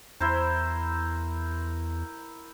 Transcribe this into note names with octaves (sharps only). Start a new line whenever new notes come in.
E2 E4 A#4 C5